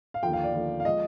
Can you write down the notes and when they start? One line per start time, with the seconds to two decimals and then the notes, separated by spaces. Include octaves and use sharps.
0.14 F5
0.23 D#2 D3 F3 G5
0.33 F5
0.43 D5
0.54 D#2 D3 F3
0.80 F5
0.85 F3 G#3 D#5